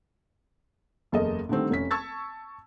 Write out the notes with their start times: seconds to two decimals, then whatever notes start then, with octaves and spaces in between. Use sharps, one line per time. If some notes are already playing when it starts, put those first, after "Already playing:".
1.12 F#1 E2 A4 A#4 D#5
1.49 D3 D#3 G3 A3 C4
1.70 F1 C#4 B6
1.91 A5 C#6 E6 G#6 A6